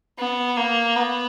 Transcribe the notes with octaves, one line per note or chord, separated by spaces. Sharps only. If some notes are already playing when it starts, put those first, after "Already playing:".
B3
A#3
B3